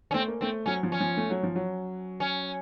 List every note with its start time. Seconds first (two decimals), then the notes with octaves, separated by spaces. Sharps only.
0.11 C#4
0.14 A3 C4
0.28 A#3
0.41 A3 C4
0.66 F#3 C#4
0.83 F3
0.92 C#4
1.01 F3
1.17 A3
1.30 F#3
1.43 F3
1.55 F#3
2.20 C#4